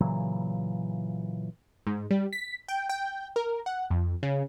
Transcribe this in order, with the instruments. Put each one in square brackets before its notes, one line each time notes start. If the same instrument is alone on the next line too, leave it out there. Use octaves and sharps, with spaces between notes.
[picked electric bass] A#2 C#3 E3 F#3
[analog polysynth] G#2
G3
B6
G5
G5
A#4
F#5
F2
C#3